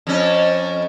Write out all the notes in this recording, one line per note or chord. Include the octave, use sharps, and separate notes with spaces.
F2 C#4